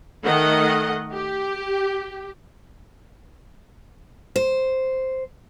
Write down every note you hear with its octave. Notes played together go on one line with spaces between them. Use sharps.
D#3 A3 D#5 F#5
G4
C5